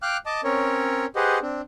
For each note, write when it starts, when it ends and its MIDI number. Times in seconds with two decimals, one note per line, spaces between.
0.02 0.17 77
0.02 0.17 79
0.02 0.17 86
0.02 0.17 89
0.02 0.17 90
0.26 0.41 75
0.26 0.41 81
0.26 0.41 86
0.44 1.06 60
0.44 1.06 61
0.44 1.06 70
0.44 1.06 73
1.16 1.39 67
1.16 1.39 68
1.16 1.39 71
1.16 1.39 72
1.16 1.39 75
1.16 1.39 78
1.42 1.61 60
1.42 1.61 62